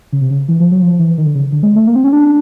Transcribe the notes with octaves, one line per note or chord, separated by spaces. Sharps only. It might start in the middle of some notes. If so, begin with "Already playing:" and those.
C#3
C3
C#3
E3
F3
F#3
F3
E3
D#3
D3
C#3
D3
G#3
A3
A#3
C4
C#4
D4